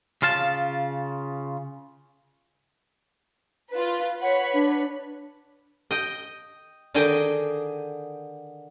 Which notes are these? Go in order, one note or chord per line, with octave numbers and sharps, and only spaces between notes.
C#3 F4 F5 A5
F4 B4
B4 C#5 F#5 B5
D4
D#5 G5
D3 D#3 G#4 D#5 G5